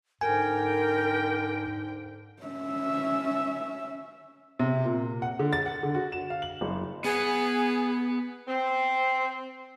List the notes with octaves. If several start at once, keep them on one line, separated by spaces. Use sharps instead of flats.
G#2 D3 A#4 G5 G#5
C#4 E5
C3
A#2
F#5
D3
A6
F#5
D3
F#4
E7
F5
F#7
F#1
B3 G#4 F#5
C4